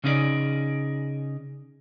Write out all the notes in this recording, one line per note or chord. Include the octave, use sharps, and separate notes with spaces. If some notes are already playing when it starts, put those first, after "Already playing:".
C#3 C#4 D#4 E4 G#4 D5